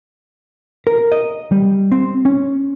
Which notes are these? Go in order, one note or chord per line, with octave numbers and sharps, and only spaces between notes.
A#4
D#5
G3
C4
C#4